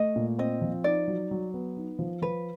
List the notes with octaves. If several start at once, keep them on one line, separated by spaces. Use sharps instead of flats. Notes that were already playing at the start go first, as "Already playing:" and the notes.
Already playing: A3 D#5
A#2
C4 D#5
F3
D#4 D5
F#3
F#3
B3
D#4
F3
F3 B4